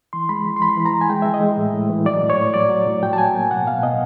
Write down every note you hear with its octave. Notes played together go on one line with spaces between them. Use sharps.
E3 C6
G#3 B5
E3
C6
E3 B5
E3
A#5
E3
G#5
G#3 G5
E3 E5
D#5
G#3
A2
A2
E3
F#3 D5
A2
C#5
A2
F#3 D5
F#3
A2
F#3 G5
A5
F#3 G#5
A#3
B2 F#5
B2 F5
B2 D#5